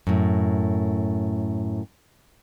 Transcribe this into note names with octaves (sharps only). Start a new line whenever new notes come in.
F#2 A2